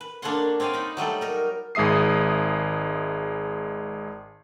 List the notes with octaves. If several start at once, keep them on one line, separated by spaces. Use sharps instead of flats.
B4
A#3 D4 A4 C#5 F#5 C6
C4 C#5 D5 F5 G#5
D#4 B5
F#3 G3 A3 A4
D#4 A#4
G#1 G#3 E5 D#6 C7